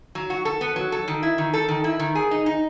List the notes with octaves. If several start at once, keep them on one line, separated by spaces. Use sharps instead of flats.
F#3
F#4
A4
B3
F#3
A4
D#3
E4
D#3
A4
D#3
E4
D#3
G#4
D#4
D#4